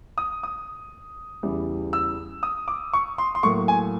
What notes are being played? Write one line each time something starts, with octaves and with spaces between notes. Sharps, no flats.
D#6
D#6
E2 C#3 E3 G3
E6
D#6
D6
C#6
C6
C6
A2 F#3 A#3 C#6
G#5